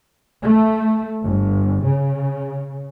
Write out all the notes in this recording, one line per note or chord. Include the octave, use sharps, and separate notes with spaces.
A3
G1
C#3